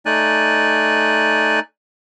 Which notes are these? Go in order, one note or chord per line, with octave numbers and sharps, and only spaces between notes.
A3 D#4 D5 G#5 F#6